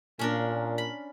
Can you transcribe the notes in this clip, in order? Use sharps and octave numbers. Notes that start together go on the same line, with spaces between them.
A#2 C#4 D4 A#4
B5